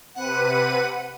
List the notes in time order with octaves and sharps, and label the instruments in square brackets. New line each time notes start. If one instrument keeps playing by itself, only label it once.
[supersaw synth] C3 B4 D#7 [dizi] F#5